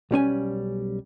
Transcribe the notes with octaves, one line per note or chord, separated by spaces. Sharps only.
B1 G3 C#4 G#5